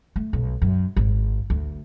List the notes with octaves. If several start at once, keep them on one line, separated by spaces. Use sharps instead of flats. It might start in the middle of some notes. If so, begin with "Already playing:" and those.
A3
B1
F#2
G#1
D2